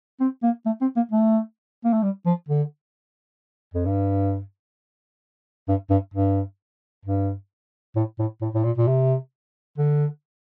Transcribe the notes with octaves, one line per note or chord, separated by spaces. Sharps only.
C4
A#3
A3
C4
A#3
A3
A#3
A3
G3
F3
D3
F2
G2
G2
G2
G2
G2
A2
A2
A2
A2
A#2
A#2
C3
D3